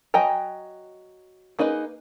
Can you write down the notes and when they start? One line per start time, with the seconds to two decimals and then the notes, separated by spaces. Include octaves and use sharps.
0.14 F#3 D#5 G5 G#5 A#5
1.59 A#3 D#4 G#4 B4 D#5